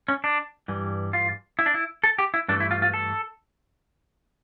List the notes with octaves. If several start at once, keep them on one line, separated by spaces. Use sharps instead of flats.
C#4
D4
G2 E3 G3
F4
E4
D4
E4
A4
G4
E4
G2 E3 A3 D4
E4
F4
F4
A4